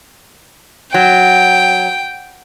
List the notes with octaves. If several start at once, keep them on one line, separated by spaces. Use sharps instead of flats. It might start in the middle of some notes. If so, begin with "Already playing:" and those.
F#3 G5